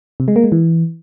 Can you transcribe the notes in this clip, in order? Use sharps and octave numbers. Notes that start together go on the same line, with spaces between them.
C3
G#3
A#3
G#3
E3